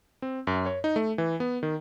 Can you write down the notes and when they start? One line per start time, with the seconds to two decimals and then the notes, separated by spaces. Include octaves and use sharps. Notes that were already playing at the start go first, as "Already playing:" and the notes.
0.22 C4
0.47 F#2
0.66 C#5
0.84 D#4
0.96 A3
1.18 E3
1.40 B3
1.63 D#3